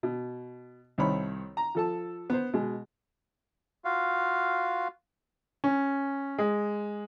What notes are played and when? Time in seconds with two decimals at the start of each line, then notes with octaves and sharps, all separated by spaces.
0.03 B2
0.98 C2 D#3 C4 C#5 B5
1.57 A#5
1.75 F3 A4 A5
2.30 B3 C5
2.53 B2 G#3
3.85 F4 F#4 F5
5.64 C#4
6.38 G#3